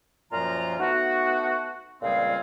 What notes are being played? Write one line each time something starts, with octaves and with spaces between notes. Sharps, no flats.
F#2 A#2 F3 F4 F5 A#5
A3 B3 D#4 F#4
C#2 A#2 G3 C4 G#4 F5